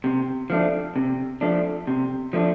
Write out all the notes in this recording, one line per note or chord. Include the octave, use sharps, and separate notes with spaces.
C3
F3 A3 D4
C3
F3 A3 D4
C3
F3 A3 D4